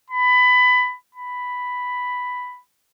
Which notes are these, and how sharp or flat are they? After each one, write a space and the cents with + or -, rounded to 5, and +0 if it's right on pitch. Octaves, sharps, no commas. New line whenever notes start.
B5 +20
B5 +5